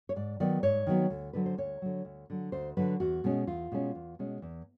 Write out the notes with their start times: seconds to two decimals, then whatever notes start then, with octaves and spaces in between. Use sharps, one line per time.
0.09 C#5
0.16 G#2 D5
0.40 D#3 F#3 B3 D5
0.63 G#2 C#5
0.87 D#3 F#3 B3
1.10 D2
1.33 D3 F#3 B4
1.46 C5
1.58 D2 C#5
1.82 D3 F#3
2.05 D2
2.30 D3 F#3
2.52 D2 C5
2.77 D3 F#3 B4
3.00 E2 F#4
3.24 B2 G#3 C#4
3.47 E2 F4
3.72 B2 G#3 C#4
3.95 E2
4.19 B2 G#3 C#4
4.42 E2